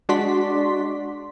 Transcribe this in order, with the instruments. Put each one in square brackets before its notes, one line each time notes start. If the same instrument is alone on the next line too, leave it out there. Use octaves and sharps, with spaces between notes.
[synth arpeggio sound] G#3 D4 F#4 D5 C6 B6